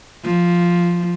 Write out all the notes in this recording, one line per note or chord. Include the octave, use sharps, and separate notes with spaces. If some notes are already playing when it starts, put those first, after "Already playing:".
F3